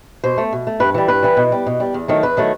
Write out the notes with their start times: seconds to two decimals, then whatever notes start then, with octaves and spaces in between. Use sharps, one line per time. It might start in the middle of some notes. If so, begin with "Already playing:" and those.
0.24 B2 C5
0.38 A3
0.53 B2
0.67 A3
0.80 G2 B4
0.94 E3 G3
1.08 G2 B4
1.23 E3 G3
1.37 B2
1.52 G3
1.66 B2
1.80 G3
1.94 E2
2.08 D#3 F#3 A3
2.23 E2 B4
2.37 D#3 F#3 A3